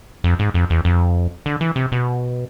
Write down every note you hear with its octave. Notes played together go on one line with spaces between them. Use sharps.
F2
G#2
F2
E2
F2
D3
E3
C3
B2